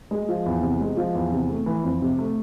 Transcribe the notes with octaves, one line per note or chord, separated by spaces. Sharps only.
G#3
F3
E2
C3
G#3
F3
E2
C3
A3
E3
F2
C3
A3